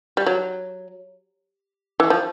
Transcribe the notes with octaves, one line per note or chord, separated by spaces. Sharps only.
G3
F#3
E3
F3